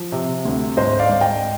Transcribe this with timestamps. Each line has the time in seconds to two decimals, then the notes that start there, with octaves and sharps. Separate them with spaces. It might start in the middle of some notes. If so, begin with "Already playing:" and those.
Already playing: F3
0.12 C3
0.45 D2
0.77 G#2 C5 D#5
0.99 D5 F5
1.09 G#2
1.21 D#5 G5